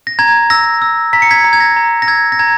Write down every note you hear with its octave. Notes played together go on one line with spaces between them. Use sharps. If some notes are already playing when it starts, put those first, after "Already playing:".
A#6
A#5 G#6
E6 A#6
E6
A#5 B6
C#7
G#6 B6
A#5
G#6
A#6
A#5
A#6
E6 G#6
A#6
A#5 G#6